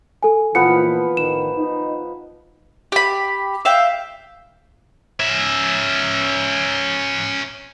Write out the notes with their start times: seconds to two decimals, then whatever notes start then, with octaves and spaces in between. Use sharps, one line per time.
0.23 A4 G#5
0.55 A#2 E3 F3 B3 B4 C#7
1.17 A1 D#3 E7
1.57 D#4
2.92 G4 B5
3.65 E5 F5 G5
5.20 C#4 E5